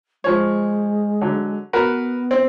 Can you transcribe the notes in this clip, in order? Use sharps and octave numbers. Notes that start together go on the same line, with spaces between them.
F3 G#3 C#5
D3 F#3
B3 F#4 A#4 B4
C4